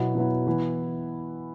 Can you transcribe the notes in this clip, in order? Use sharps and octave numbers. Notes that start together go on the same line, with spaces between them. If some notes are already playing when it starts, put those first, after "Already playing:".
Already playing: B2 F#3 B3 E4
B2 F#3 B3 E4
E3 B3 E4